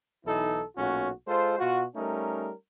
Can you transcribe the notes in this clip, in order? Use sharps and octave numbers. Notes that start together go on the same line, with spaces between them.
B1 E3 D#4 E4 A4
B1 A#2 C#4 F#4
G#3 F4 A4 C5
B2 F4 F#4
G3 A3 C#4 D#4 A#4